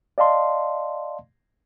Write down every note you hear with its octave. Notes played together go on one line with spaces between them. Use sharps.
D5 D#5 F5 A5 C6